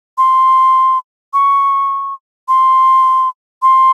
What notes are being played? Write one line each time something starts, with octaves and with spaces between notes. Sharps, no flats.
C6
C#6
C6
C6